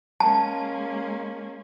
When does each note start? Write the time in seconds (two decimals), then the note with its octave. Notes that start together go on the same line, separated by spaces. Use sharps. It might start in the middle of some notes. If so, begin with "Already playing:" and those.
0.20 G#3 A#3 C#4 A5